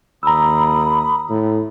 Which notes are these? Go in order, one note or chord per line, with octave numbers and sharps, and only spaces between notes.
D#2 A#5 B5 D#6 E6
A2